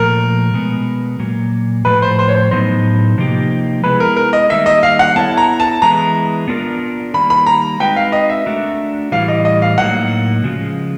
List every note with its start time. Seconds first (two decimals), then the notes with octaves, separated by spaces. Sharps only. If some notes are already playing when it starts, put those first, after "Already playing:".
Already playing: A#2 F3 A3 A#4
0.54 B2 G#3 B3
1.19 A#2 F#3 A#3
1.85 A2 F3 A3 B4
2.02 C5
2.19 C5
2.28 C#5
2.35 C5
2.51 A2 F#3 B3 D#4 C5
3.18 C3 F3 A#3 D#4 G4
3.83 G#3 B3 E4 G#4 B4
4.00 A#4
4.17 A#4
4.33 D#5
4.50 D#3 G3 A#3 D#4 E5
4.66 D#5
4.83 F5
4.99 F#5
5.16 B3 E4 A4 C#5 E5 A5
5.37 A#5
5.60 A5
5.82 E3 G#3 B3 E4 A#5
6.48 B3 D4 F4 A#4 D5
7.14 D#3 G3 A#3 B5
7.30 B5
7.46 A#5
7.80 G#3 C4 D#4 F#4 B4 G5
7.96 F5
8.12 D#5
8.29 E5
8.46 A3 D4 F#4 A#4
9.12 A2 E3 G3 F5
9.28 D#5
9.45 D#5
9.62 F5
9.78 A2 F#3 A#3 D#4 F#5
10.44 C#3 F3 G#3